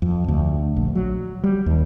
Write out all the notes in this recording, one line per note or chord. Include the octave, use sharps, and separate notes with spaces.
F2
D2
A#1
F#3
G3
D#2